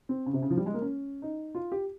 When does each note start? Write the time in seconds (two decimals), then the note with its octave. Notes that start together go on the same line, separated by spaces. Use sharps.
0.09 C4
0.26 C#3
0.33 C3
0.42 C#3
0.50 F3
0.57 G3
0.66 G#3
0.74 A#3
0.82 C#4
1.22 D#4
1.55 F4
1.72 G4